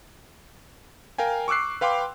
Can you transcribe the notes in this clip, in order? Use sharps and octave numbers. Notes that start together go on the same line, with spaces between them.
A#4 F5 G5 G#5
C#6 D6 E6 F#6 C7
B4 F5 G5 C6 D6